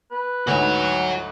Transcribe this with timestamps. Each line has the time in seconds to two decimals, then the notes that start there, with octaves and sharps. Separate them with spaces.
0.11 B4
0.47 D2 G#2 F#4 C#5